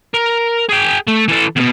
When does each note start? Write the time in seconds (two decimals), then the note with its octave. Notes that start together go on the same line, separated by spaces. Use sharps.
0.14 A#4
0.69 G#4 G5
1.07 A3
1.28 E3 A4
1.56 E2 B2